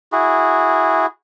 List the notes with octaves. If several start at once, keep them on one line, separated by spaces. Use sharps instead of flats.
E4 F#4 G#4